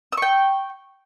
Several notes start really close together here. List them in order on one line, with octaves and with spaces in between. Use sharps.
E6 C#6 G5